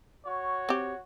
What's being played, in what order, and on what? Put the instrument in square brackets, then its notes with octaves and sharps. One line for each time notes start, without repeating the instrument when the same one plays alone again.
[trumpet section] F#4 C#5
[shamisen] C4 G4